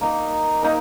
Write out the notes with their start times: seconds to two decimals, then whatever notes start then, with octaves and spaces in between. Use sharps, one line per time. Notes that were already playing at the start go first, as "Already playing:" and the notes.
0.01 A#3 D#4 A#4
0.63 A#3 D#4 A#4